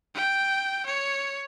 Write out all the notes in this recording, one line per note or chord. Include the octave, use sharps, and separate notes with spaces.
G5
C#5